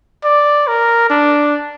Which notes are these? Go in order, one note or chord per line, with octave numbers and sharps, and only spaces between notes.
D5
A#4
D4